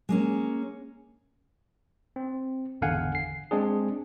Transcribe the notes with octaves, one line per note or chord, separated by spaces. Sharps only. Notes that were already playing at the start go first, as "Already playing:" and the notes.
G#3 A#3 C#4
C4
G#1 E2 D3 F5 F#5 G#5
C7
G#3 C4 D4 G#4